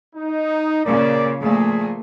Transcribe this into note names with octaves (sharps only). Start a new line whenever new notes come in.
D#4
A#2 C#3 A#4 D5
A#2 F3 A3 G#4